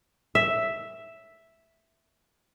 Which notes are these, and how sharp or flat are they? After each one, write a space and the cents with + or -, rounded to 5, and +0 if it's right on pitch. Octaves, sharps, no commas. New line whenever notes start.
E5 +0